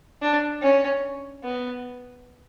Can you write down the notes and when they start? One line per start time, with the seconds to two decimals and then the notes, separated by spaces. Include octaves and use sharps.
0.22 D4
0.62 C#4
1.43 B3